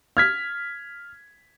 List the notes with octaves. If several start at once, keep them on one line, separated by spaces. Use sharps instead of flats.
F6 G#6 B6